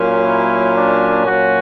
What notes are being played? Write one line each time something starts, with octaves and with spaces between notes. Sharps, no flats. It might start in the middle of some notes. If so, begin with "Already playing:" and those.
Already playing: A#2 F#3 A#3 C#4
E4
D4
A#2 F#3 A#3 C#4 F#4